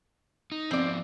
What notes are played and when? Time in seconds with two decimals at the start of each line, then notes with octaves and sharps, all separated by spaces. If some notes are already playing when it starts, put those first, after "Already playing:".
0.52 D#4
0.71 F3 B3 C4 D5